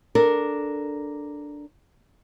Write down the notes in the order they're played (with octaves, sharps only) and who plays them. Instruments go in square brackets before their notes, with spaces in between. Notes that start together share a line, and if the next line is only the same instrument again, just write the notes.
[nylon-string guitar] D4 A4 A#4